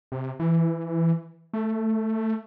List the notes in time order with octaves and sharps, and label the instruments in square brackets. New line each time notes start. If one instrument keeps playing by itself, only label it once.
[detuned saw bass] C3
E3
A3